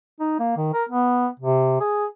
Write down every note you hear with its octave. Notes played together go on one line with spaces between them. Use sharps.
D#4
A#3
D#3
A#4
B3
C3
G#4